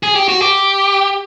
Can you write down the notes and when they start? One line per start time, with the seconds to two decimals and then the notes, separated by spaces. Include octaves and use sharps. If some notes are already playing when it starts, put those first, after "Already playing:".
0.03 G#4
0.15 G4
0.28 F#4
0.41 G4